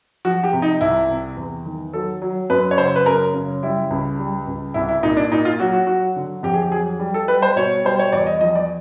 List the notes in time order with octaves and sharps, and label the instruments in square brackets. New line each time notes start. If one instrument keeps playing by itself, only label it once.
[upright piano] F3 F#4
G4
C3
D#4
C2 E4
C3
E2
D#3
F#3 A4
F#3
F#2 B4
C#5
C#3 C5
B4
F#2 A#4
C#3
G3 E4
C#2
G3
C#2
C2 E4
E4
A#2 D#4
D4
A#2 D#4
F4
F#3 F#4
F#4
F#3 F#4
D3
F2 G4
G#4
G4
F#3 G#4
G3
A4
G3 B4
C5
B2 C#5
G3 C5
C#5
E2 D5
D#5
F3 D#5
D5